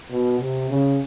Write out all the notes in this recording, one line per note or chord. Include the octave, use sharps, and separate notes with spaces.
B2
C3
C#3